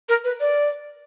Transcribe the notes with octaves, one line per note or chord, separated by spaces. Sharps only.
A#4
B4
D5